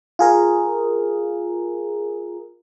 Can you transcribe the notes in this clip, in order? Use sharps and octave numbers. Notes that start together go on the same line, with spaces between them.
F4 G#4 A#4